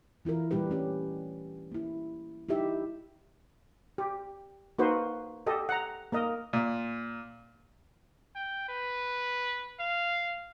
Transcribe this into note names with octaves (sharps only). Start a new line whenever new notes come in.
E3 E4 F4 A#4
A#2 G3 D4 G4 B4
A3 C#4 G4
A#3 E4
D#4 E4 G4 E5
G4
A#3 D#4 F#4 B4 C5
G4 A4 D#5
F#5 A#5
A#3 A#4 D#5
A#2
G5
B4
F5